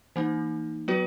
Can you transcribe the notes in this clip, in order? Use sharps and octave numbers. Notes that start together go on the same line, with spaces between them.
E3 A#3 D#4
F#3 B3 F#4 B4